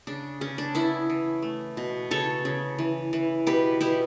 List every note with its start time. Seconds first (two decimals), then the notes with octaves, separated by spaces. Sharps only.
0.07 C#3 D4
0.41 C#3 C#4
0.58 D4
0.74 B3 C#4 E4
1.10 E3
1.42 A3
1.77 B2
2.11 C#3 A4 C#5
2.45 C#3
2.78 E3
3.13 E3
3.46 B2 G4 B4
3.81 B2 E4 G4